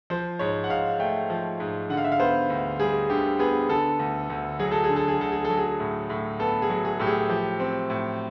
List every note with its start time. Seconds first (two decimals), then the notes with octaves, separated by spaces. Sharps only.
0.10 F3 C5
0.39 G#2 C#5
0.64 F#5
0.70 G#2 F5
0.99 A3 G5
1.30 F3
1.60 G#2
1.90 D3 F#5
1.97 F5
2.04 E5
2.12 F5
2.20 B3 C5
2.50 D2
2.80 G3 G#4
3.10 D3 G4
3.39 B3 G#4
3.69 D3 A4
3.99 D2
4.30 D2
4.59 F#3 G#4
4.71 A4
4.84 G#4
4.89 D3
4.96 A4
5.08 G#4
5.20 D2 A4
5.32 G#4
5.45 A4
5.50 F#3
5.57 G#4
5.80 A2
6.10 A2
6.39 B3 A4
6.62 G#4
6.70 F#3
6.85 G#4
7.00 A2 G4
7.07 G#4
7.30 F3 G4
7.60 C4
7.90 A2